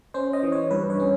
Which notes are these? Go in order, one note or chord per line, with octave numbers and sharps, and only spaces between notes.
C#4 C5
D#5
E3
C#5
G2 B4
C#5
C#4